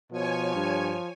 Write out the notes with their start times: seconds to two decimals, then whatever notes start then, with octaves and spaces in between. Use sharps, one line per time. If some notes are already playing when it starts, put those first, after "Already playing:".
0.12 B2 F3 C#5 G#5
0.55 G2